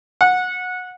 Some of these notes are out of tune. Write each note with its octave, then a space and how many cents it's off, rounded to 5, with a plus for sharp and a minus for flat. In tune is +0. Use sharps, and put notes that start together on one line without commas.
F#5 -20